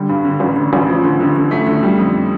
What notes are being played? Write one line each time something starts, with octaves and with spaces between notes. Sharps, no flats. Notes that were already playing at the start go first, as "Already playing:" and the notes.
Already playing: D3 G3
G2
D3
A1
D3
A1
F3
D3
D3
D3
A3
D3
G3
F2